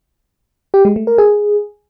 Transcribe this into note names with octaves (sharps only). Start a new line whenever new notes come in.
G4
G#3
A3
A#4
G#4